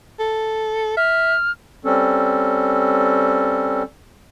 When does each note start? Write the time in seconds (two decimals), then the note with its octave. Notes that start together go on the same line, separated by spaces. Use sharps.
0.19 A4
0.97 E5 F6
1.85 G3 C4 C#4 A4